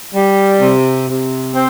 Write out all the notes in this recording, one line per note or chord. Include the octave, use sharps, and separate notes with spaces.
G3
C3
C3
C4